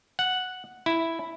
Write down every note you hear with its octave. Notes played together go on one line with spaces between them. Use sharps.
F#5
E4